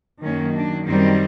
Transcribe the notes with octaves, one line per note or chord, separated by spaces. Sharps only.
F#2 D#3 F#3 A#3 C#4
D4
F#2 D#3 G3 C4 D#4